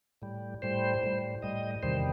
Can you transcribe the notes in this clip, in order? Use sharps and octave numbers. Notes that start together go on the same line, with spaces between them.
A2 G3
A2 G3 C5
A2 G3
A2 G3 D#5
E2 C3 D#3 G3 C5